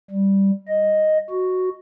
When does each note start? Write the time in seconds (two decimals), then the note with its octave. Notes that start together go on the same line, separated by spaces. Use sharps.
0.10 G3
0.68 D#5
1.31 F#4